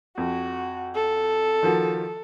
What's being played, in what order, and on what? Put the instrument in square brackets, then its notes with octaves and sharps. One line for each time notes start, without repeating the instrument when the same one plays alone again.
[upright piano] F2 [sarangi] F#4
[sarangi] A4
[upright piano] D#3 F3 F#4